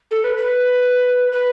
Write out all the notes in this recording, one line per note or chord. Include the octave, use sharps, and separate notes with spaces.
A4
B4
B4
B4